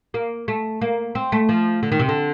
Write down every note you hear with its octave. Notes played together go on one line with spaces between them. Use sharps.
A#3
A3
A#3
C4
A3
F3
D3
D#3
C3
D3